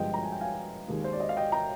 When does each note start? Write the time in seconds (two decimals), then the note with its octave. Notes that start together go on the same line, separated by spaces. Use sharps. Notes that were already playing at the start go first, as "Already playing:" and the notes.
Already playing: G1 G2 F3 G#3 D#5 G5
0.14 A#5
0.23 G#5
0.32 G5
0.41 F5 G#5
0.88 D#2 D#3 G#3
1.04 C5
1.13 D5
1.20 D#5
1.29 F5
1.37 D#5 G5
1.52 G5 A#5